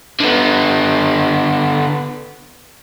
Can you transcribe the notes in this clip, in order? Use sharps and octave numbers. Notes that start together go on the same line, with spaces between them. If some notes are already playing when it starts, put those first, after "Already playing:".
D3 B3